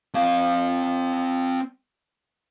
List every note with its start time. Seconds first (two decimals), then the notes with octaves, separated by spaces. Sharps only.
0.15 C4 F5